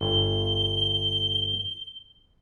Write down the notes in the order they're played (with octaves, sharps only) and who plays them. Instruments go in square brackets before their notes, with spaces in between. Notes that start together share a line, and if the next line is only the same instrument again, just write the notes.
[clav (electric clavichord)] G1 [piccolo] G7